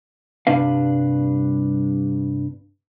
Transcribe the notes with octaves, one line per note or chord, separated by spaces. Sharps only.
C2 G2 C3 D4 B4 F5